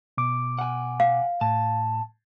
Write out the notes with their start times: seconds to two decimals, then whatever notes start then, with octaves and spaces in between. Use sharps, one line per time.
0.18 B2 D6
0.59 F#5 G#5
1.00 F5
1.41 A2 A5